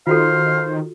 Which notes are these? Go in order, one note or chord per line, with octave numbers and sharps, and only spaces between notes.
D#3 F4 F#4 A4 C5 F5